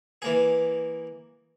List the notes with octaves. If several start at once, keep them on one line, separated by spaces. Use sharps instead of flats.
E3 A#3 G#4